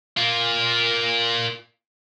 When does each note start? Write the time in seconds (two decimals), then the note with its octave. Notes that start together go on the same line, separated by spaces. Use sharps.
0.17 A#3 F4